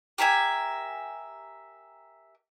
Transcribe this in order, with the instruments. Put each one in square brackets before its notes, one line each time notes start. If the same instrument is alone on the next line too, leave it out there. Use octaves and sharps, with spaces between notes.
[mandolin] G4 A#4 E5 G#5